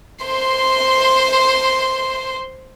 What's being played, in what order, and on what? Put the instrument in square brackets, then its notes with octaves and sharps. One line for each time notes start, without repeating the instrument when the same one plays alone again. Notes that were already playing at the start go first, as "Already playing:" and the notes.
[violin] C5 C6